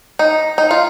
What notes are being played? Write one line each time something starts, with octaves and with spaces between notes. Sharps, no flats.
D#4
D#4
F4